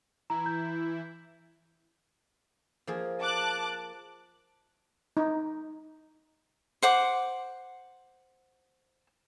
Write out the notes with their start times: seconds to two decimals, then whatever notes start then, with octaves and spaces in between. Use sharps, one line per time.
0.30 E3 E4 A#5
0.46 G6
2.87 F3 A#3 G#4
3.21 A5 D6 F#6
5.17 D#4
6.83 C5 F#5 D6